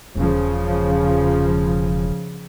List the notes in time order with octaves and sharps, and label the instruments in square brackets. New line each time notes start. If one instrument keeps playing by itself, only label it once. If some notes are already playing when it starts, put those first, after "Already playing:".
[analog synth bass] E1 [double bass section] C#3 F3